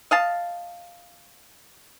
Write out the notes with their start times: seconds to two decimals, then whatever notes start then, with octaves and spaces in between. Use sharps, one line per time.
0.11 D#5 F5 A5